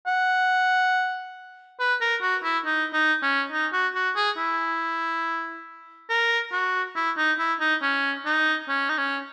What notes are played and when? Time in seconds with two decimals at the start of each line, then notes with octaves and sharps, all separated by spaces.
0.07 F#5
1.80 B4
2.01 A#4
2.22 F#4
2.44 E4
2.65 D#4
2.94 D#4
3.23 C#4
3.52 D#4
3.73 F#4
3.95 F#4
4.16 G#4
4.38 E4
6.09 A#4
6.53 F#4
6.96 E4
7.17 D#4
7.39 E4
7.60 D#4
7.82 C#4
8.26 D#4
8.69 C#4
8.89 D#4
8.98 C#4